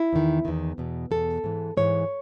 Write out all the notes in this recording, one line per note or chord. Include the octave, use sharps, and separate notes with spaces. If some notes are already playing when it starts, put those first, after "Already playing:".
Already playing: E4
E2 D#3
E2 D#3
E2 B2
E2 B2 A4
G#2 E3
G#2 E3 C#5